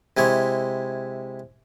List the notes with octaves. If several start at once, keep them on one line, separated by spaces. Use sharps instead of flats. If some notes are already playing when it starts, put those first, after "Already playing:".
C3 G#3 E4 C#5